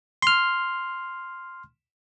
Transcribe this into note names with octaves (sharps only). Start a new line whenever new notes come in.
C6 F6